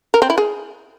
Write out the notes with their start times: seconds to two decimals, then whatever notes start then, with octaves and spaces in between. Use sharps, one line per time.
0.14 A#4
0.22 C4
0.30 E4
0.38 G#4